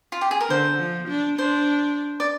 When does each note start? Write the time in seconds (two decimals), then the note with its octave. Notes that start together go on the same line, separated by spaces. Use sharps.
0.12 F4
0.21 G4
0.31 G#4
0.41 A#4
0.49 D3 C5
0.79 F3
1.08 D4
1.38 D4 C5
2.20 D5